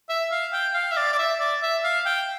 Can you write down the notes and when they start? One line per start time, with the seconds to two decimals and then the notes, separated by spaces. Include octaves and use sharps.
0.09 E5
0.31 F5
0.53 G5
0.74 F5
0.92 E5
0.97 D5
1.13 D5
1.19 E5
1.40 D5
1.62 E5
1.84 F5
2.06 G5